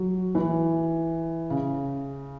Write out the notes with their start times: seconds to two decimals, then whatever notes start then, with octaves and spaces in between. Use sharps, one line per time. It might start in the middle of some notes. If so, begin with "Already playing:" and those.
Already playing: F#3
0.35 E3
1.50 C#3